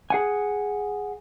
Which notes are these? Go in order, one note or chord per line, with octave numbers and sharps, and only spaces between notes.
G#4 F#5 G#5